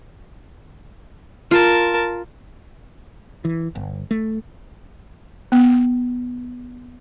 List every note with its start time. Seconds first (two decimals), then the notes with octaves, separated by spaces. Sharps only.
1.51 F4 A#4 A5
3.45 E3
3.75 G1
4.11 A3
5.52 B3